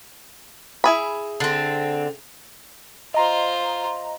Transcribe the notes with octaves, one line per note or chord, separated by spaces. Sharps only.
E4 G#4 B5
D3 C4
F4 C5 D#5 A#5